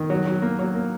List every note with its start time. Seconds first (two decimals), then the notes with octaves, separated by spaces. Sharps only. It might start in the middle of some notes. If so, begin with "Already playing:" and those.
Already playing: D#3
0.10 F#3
0.27 F#3
0.42 A#3
0.59 F#3
0.75 A#3